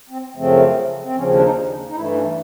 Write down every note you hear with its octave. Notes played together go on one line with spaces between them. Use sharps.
C4
F#2 C#3 F3 A3 C4
C4
D#2 C#3 F3 C#4
D4
D#4
D#4
G2 E3 A3 E4
C#4